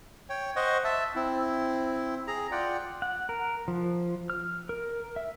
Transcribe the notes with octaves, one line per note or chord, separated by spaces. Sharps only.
C#5 G5
C5 D#5 F#5 C#6
E5 A5
C4 E4
G#4 A#5
F4 D5 F#5 G5
F#5
A#4
F3
F6
A#4
E5